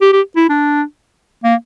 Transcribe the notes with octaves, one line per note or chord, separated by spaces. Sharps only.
G4
G4
E4
D4
A#3